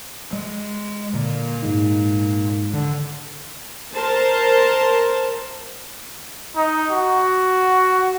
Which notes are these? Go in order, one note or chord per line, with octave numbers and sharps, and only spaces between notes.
G#3
A#2 D3
G#2 G#3 D#4
D3
A#4 C5 A5
D#4
F#4